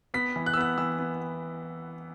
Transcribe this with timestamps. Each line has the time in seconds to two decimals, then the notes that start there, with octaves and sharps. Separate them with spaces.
0.14 B3 B6
0.36 E3
0.46 F#6
0.54 E6
0.57 B3 F#6
0.78 E3 E6
0.99 B3